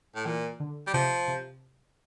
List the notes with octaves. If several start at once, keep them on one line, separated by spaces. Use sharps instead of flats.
A2
A#2 E3
D3
G3
C3 F3
C3